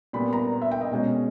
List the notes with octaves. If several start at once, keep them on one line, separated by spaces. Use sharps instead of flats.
A#2 G3 B3 B5
A#5
E5
G5
D#5
B2 G#3 C#4